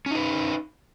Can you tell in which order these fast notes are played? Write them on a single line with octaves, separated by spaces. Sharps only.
C#4 D#4 B4